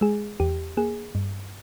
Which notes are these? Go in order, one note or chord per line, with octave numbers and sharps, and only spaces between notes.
G#3 G#4
E2 G4
A#3 G#4
G2